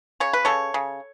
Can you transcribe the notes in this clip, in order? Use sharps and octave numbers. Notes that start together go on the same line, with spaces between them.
C#3 C#5
B4
C#3 A4 C#5
C#3